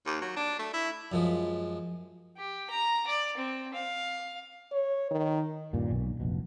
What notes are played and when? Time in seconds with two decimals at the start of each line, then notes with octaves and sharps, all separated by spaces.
0.06 D#2
0.21 F#3
0.37 D4
0.59 A3
0.73 E4
1.12 F#2 F3 G#3
2.38 G4
2.70 A#5
3.07 D5
3.37 C4
3.74 F5
4.72 C#5
5.11 D#3
5.73 D#1 G2 A#2
5.91 B1
6.20 F1 A#1 B2